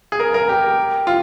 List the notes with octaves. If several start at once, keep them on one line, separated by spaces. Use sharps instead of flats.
G#4
A#4
A#4
G4
F4